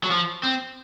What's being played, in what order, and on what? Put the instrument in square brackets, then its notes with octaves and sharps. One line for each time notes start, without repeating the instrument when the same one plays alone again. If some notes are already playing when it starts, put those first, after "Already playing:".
[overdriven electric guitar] F#3
F3
C4